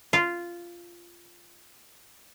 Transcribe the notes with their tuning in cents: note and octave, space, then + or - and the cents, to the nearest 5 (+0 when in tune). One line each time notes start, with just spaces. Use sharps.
F4 -10